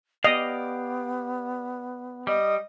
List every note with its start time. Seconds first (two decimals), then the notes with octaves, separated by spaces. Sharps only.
0.24 B3 G4 D5 D#5 F5
2.27 G3 D#5